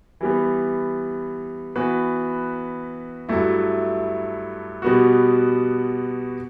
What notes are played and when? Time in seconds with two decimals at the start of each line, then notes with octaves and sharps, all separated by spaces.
0.21 E3 G3 B3
1.76 E3 B3 F#4 B4
3.29 G2 F#3 A3 E4
4.82 B2 G3 B3 F#4